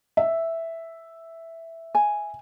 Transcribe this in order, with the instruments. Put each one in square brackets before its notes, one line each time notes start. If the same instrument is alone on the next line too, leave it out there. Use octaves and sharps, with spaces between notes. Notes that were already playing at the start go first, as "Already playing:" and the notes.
[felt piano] E5
[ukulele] G#5